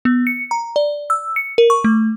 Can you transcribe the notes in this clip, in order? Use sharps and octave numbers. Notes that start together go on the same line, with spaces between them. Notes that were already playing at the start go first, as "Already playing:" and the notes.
B3
C#7
A#5
D5
E6
C#7
A#4
C#6
A3